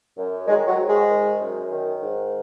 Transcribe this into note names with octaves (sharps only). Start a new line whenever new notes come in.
F#2
D#3 G#3
F#3
G#2
G#3
D#3
F#2
D#3
G#2